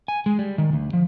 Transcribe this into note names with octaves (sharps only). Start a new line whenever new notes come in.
G#5
G#3
G3
D#3
D2
F3